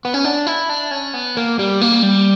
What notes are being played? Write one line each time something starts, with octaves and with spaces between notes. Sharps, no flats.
B3
C#4
D4
E4
D4
C#4
B3
A#3
G3
A#3
G3